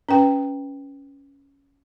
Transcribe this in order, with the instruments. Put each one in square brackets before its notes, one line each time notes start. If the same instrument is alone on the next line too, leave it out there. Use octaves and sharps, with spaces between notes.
[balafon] C#4 B4 G5